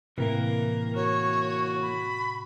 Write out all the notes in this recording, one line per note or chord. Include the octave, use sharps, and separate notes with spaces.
A2 C3 E3 A#3 A#4
F#4 C#5
B5